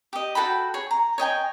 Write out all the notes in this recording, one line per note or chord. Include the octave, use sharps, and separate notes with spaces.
G4 D#5
F#4 A4 G5 B5
G#4 C#5
A#5
C#5 D#5 G5 G#5